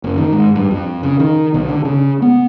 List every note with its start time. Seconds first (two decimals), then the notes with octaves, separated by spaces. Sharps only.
0.04 F#1
0.17 D#3
0.33 G#2
0.55 G2
0.71 F2
1.03 C#3
1.20 D#3
1.54 B1
1.68 D3
1.85 C#3
2.22 B3